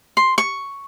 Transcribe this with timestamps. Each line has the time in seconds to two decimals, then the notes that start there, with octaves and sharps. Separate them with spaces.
0.17 C6
0.38 C#6